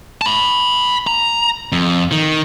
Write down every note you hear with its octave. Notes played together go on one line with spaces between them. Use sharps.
A5 B5
A#5
F2
D#3